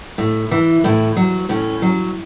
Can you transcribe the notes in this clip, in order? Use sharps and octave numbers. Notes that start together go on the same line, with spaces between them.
A2
E3
A2 E4
F#3
A2 C#4
F#3